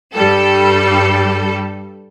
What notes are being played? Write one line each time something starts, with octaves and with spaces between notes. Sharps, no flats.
G2 G3 A4